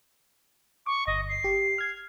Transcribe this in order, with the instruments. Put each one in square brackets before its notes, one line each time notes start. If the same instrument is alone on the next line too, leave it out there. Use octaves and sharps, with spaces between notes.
[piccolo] C#6 [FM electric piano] D6
[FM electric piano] G1 [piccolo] D#5
[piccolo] C7
[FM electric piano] G4
F6 G#6